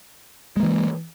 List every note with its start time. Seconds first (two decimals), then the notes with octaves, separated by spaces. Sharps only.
0.57 G#3
0.60 A#3
0.63 E3